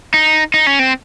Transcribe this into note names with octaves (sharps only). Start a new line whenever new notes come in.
D#4
D#4
C#4
C4